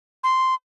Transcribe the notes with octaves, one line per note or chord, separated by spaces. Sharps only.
C6